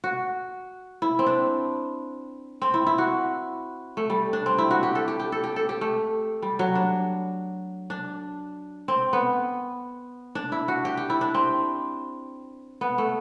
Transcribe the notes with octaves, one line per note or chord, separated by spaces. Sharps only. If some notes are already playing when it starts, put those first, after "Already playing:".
F#4
E4
C4
D4
C4
E4
E4
F#4
A3
G3
D4
C4
E4
F#4
G4
A4
G4
G4
A4
G4
A4
G4
A3
G3
F#3
D4
D4
C4
B3
D4
E4
F#4
G4
G4
E4
D4
C4
B3
A3